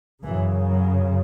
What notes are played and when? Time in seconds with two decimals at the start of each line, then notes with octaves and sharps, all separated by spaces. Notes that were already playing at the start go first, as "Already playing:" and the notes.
0.23 F#2 C#3 E3
0.70 F#3